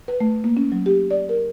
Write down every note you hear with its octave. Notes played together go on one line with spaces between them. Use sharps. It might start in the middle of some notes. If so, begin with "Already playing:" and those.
B4
A3
A#3
C#4
F#3
G4
D5
A#4